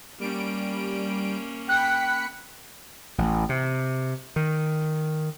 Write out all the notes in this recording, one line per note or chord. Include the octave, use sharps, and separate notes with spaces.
G3 A#3 C#4 D7
G5 B5 F#6 B6 C#7
A1
C3
D#3